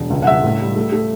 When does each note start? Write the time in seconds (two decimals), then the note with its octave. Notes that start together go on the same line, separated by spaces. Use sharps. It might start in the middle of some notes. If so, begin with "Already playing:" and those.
Already playing: E1
0.10 C#2
0.22 F#5
0.27 C#2 E5
0.43 A2
0.60 G3
0.76 A3
0.92 A3